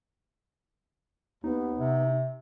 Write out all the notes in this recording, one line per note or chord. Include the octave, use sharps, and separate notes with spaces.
D#2 B3 D#4
C3